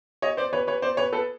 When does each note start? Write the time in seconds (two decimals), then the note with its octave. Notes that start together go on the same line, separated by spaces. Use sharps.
0.22 C#5 D#5
0.37 C5 D5
0.53 B4 C#5
0.67 B4 C#5
0.82 C5 D5
0.97 B4 C#5
1.13 A4 B4